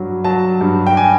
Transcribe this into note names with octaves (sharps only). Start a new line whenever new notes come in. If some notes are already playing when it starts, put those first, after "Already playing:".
Already playing: G2 F#3
F#3 A5
G2
G5
G#5